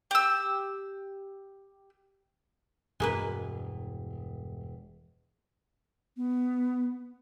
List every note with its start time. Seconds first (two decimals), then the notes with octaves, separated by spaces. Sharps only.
0.11 G4 E6
3.00 E1 G2 G#3 A#3 B4
6.17 B3